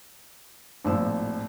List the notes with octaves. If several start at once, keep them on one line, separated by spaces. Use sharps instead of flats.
D#1 G#1 A2 F3 E6